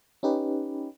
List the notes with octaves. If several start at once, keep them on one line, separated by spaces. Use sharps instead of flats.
C#4 D#4 G4 B4